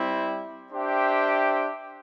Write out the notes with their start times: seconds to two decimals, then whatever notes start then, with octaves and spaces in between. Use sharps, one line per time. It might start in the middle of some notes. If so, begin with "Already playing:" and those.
Already playing: G3 C4 E4
0.72 D4 G4 C5 E5 G5